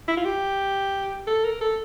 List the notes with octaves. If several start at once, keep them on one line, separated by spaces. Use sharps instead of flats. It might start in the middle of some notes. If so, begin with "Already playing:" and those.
E4
F4
G4
A4
A#4
A4